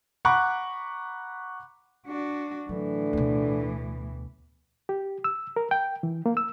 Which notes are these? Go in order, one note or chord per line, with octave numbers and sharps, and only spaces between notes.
F#5 A#5 B5 C#6 D6 F#6
D4 F#4
A2 D3 E3 F#3
D2 B2
G4
E6
A#4
G5
E3
A#3
E6